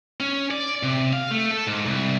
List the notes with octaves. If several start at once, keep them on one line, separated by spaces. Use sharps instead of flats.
C#4
D5
C3
F5
A3
A4
G#2
C2